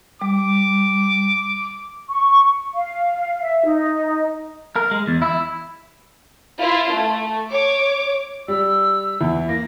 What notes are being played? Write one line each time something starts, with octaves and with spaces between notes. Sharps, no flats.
G3 D6
C#6
F5
E5
D#4
A#4
G#3
E2
E4
E4 F4
A3
C#5 D6
G3 E6
E2 E3 E4
A#3 A#6